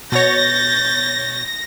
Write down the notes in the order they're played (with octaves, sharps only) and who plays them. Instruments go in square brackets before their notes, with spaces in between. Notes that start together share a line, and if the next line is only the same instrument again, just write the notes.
[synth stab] B2 C#5 [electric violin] G6 A6 [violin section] A#6